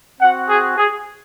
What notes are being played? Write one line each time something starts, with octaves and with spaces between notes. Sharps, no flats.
C4 F#4 F#5
G#4
G#4